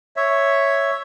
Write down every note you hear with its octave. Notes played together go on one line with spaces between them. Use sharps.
C#5 E5